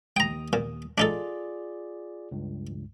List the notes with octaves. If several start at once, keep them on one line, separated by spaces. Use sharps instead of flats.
D#2 G5 A#5 D#6
A#2
D4 D#4 F4 G#4 A4 D5
C#2 G2